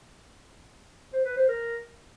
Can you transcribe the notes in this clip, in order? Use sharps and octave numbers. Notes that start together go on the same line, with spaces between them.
C5
B4
C5
A#4